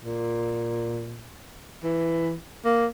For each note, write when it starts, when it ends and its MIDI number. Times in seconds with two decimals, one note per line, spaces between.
0.05 1.32 46
1.84 2.34 52
2.65 2.86 58